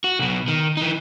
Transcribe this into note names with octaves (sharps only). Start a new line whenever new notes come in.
F#4
B1 B2
D#3
E3 D#4